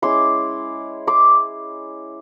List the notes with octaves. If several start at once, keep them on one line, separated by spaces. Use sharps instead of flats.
G#3 C#4 E4 C6 D6
C6 D6